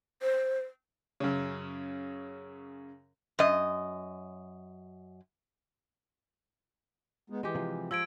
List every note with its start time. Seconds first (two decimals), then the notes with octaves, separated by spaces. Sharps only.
0.22 C5
1.20 F#2 C#3
3.39 F#2 D#5
7.30 G#3 B3 D#4
7.43 E3 G#3 G4
7.55 C3 F3
7.91 F3 E6 G#6 D7